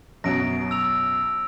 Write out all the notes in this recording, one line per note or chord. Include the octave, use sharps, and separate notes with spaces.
F#2 B2 F#3 A#6 D7
E6 F7